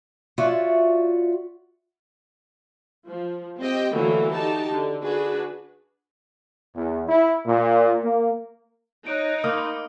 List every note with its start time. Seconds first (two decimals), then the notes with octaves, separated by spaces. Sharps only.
0.38 F4 F#4 C#5 D5 E5
3.07 F3
3.59 C4 G4 D#5 G5
3.92 D3 E3 F#3 A3 A#3 F#4
4.31 D#4 F#4 G4 A5
4.71 D3
5.02 D4 F#4 G#4 B4
6.75 E2
7.08 E4
7.47 A#2
8.02 A#3
9.07 D#4 C#5 F#6 D7
9.44 A#3 B5 C6 D6 D#6 F6